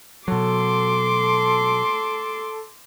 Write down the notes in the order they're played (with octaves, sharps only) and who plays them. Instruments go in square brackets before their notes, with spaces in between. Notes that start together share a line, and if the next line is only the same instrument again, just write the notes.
[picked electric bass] B2 F#3 [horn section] A4 [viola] C6 D6